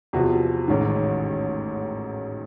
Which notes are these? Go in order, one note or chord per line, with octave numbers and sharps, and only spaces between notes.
E2 C3 F3 F#4
A1 G#2 D#3